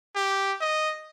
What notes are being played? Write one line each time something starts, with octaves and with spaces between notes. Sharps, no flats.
G4
D#5